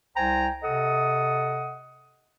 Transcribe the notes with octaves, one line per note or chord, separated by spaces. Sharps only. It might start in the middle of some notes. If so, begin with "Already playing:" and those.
C2 C5 G5 G#5 A#5
C3 A4 D#5 F#5 D#6